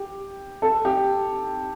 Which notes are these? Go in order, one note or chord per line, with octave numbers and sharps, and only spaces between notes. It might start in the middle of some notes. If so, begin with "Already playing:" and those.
Already playing: G4
A4
G4